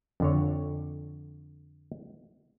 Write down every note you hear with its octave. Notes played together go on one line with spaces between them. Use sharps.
F2 D3 C#5